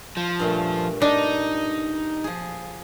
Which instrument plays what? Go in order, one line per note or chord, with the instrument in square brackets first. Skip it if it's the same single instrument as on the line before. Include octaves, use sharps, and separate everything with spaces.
[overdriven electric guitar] F3
[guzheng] G2 A#2 A3
[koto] D4 [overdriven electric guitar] D#4
[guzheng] F3 G#4